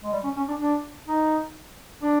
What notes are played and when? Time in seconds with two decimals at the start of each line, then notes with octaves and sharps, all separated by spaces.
0.03 G#3
0.12 G3
0.23 C#4
0.36 C#4
0.48 D4
0.59 D4
1.06 D#4
2.02 D4